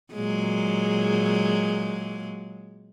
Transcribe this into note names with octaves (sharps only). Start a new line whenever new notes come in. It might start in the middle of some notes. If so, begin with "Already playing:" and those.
A#2 F#3 G#3